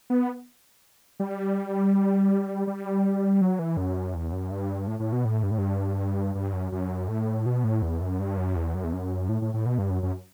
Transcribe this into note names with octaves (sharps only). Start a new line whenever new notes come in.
B3
G3
G3
F#3
E3
F#2
E2
F#2
G2
A2
A2
B2
A2
G2
A2
G2
G2
F#2
F#2
A2
B2
A2
E2
F#2
G2
F#2
E2
F#2
E2
F#2
A2
A2
A2
B2
G2
F#2
F#2